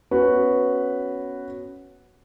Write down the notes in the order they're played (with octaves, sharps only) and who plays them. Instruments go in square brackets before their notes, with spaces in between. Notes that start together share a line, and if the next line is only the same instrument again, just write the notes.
[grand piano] B3 C#4 F#4 B4